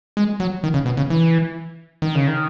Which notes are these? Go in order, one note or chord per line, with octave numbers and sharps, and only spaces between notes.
G#3
F#3
D#3
C#3
B2
C#3
E3
D#3
C#3
D#3